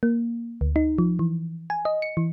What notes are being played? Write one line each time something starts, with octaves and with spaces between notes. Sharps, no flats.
A#3
D2
D#4
F3
E3
G#5
D#5
C#7
E3